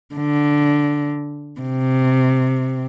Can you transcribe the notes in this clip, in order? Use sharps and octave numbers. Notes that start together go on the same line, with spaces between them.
D3
C3